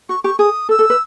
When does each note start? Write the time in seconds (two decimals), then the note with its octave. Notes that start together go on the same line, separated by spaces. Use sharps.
0.09 F#4 C#6
0.23 G4 C#6
0.39 G#4 D#6
0.69 A4 E6
0.79 A4
0.90 B4